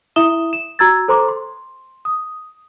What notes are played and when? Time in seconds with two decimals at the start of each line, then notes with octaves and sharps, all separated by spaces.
0.16 E4 E5 D#6 E7 G7
0.53 E7
0.79 F#4 A#5 E6 G#6 A6
1.08 A4 C5 A#5 C6 D6
1.28 C6
2.05 D#6